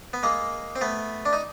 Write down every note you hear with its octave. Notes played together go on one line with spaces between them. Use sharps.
B3
G#3 A#3
C4
A3 B3
D4
D#4